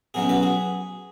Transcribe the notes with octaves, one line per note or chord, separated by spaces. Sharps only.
B2 F#3 C#4 E4 G#4
F#4 B4
G#4